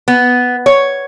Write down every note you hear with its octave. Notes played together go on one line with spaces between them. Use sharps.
B3
C#5